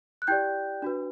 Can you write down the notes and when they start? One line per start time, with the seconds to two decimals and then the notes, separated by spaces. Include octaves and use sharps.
0.22 F#6
0.27 E4 G4 D5 G5 G6
0.82 D4 F#4 B4